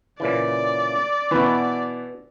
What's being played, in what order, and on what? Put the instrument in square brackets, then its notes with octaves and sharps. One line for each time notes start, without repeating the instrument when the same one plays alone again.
[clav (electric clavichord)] A#2 C#3 E3 [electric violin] D5
[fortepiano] B2 E3 [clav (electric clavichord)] F#4 B4